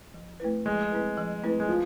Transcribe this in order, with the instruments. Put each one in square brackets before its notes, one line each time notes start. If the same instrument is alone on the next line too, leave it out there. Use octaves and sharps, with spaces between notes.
[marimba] F3
A3 C4 E4 B4
[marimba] F3 [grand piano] G#3
[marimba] A3 C4 E4 B4
F3
A3 C4 E4 B4
[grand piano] G#3
F3